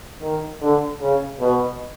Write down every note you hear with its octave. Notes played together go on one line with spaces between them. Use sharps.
D#3
D3
C#3
B2